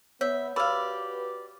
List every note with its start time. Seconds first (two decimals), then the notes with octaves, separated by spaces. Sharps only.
0.21 B3 C#5 E5
0.56 F#4 G4 A#4 B4 D5 F5 B5